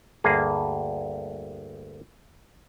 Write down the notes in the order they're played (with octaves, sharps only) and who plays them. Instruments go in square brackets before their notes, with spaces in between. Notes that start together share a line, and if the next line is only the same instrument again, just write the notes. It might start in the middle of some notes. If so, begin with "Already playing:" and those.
[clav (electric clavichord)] D2 G2 A#3 G#4